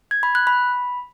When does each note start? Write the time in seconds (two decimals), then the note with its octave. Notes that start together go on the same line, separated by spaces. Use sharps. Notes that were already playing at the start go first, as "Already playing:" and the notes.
0.11 G#6
0.23 B5
0.35 F#6
0.47 B5